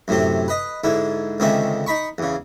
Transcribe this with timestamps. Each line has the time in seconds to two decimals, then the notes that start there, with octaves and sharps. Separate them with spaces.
0.08 F#2 A2 C3 C4
0.48 B4 D#5
0.84 G#2 D3 E4
1.40 C#2 D3 D#3 C4 C#4 E5
1.87 D#4 B5 C#6
2.18 E2 C#3